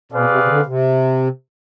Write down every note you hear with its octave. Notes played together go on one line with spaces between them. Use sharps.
B2 C4 G#4 B4 D5 F5
C3
C3
D3
C3